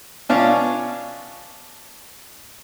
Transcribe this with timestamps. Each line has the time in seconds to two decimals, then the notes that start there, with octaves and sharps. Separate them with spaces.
0.29 B2 C#4 D4 F4